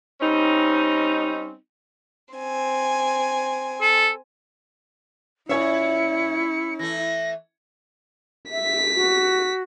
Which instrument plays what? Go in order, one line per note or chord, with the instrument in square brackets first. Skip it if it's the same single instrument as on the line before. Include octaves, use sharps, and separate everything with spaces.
[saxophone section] G3 C4 C#4 D#4
[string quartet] C4 G#5
[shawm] A4
[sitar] A#2 E5 [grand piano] C#4 C#5 G#5 [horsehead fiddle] E4 [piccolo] C#7
[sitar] E3 A3 [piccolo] A#6
[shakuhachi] E5 [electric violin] B6
[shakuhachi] F#4